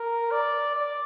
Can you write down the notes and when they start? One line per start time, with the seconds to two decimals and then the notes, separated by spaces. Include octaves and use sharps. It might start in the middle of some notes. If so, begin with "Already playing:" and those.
Already playing: A#4
0.31 D5
0.75 D5